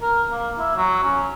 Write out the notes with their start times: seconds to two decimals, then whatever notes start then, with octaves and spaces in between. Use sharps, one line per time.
0.02 A#4
0.31 A#3
0.58 E4
0.76 F#3
1.04 C#4